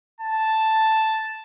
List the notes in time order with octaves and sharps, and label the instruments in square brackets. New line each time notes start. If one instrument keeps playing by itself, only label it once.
[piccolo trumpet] A5